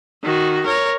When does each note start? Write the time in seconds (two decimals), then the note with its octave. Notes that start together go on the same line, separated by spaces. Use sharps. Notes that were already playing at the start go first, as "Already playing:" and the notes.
0.23 D#3 F#4
0.66 A#4 C#5